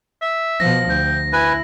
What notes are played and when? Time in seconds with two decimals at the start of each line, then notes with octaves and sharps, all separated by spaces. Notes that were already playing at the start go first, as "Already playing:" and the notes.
0.21 E5
0.60 B2 F3 A#6
0.90 D2 G5
1.33 E4 B4 G#5